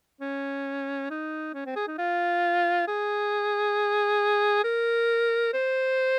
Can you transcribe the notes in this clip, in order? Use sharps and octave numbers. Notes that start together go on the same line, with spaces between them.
C#4
D#4
C#4
C4
G#4
D#4
F4
G#4
A#4
C5